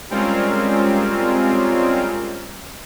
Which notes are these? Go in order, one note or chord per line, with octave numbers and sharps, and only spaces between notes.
G3 G#3 C4 C#4 F4 A#4